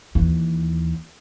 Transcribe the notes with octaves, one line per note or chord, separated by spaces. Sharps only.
D#2 E3